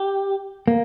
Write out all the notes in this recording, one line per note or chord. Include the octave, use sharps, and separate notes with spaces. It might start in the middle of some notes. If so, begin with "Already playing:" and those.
Already playing: G4
A#3